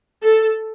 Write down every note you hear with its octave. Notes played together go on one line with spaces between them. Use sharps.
A4